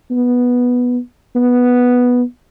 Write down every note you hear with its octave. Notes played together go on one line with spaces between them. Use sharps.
B3
B3